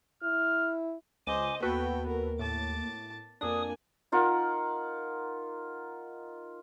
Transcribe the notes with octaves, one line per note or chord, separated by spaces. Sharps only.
E4 F6
C#2 C5 D#5 G#5 D6
D#2 B3 F#4 A4 B4 G5
A#4
A2 A5 D6
F2 A#3 D4 G#5 D#6
D#4 F4 A#4 F#5